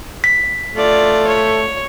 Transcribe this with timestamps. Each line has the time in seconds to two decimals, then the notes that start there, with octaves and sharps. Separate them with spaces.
0.24 B6
0.76 A3 F4 D5
1.28 C#5